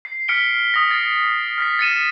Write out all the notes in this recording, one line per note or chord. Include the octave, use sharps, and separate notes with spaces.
C7
F6 B6 C#7 D7 G7
D#6 A#6
A6 C7
F6 A#6 B6
A6 C#7 D#7 E7